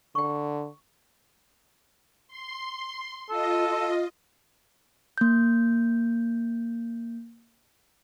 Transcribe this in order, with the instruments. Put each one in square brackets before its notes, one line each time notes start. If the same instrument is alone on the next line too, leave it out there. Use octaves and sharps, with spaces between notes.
[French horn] D3 [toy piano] G5 C#6
[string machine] C6
[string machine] F4 D#5 [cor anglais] A4
[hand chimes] A#3 G6